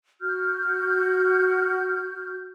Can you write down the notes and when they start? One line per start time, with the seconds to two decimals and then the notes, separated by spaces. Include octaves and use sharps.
0.21 F#4 F6 G6